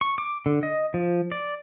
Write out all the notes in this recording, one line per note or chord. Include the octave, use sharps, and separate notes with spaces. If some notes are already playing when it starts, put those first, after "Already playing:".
C#6
D6
D3
D#5
F3
D5